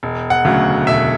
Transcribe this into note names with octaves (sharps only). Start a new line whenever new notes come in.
E1
F#5
D2 C#3 F#3 A3
E1 E5